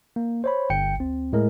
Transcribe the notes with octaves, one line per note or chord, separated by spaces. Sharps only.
A#3
C5 C#5 B5
G1 G5 C#7
D2 C4
A2 G#3 A#4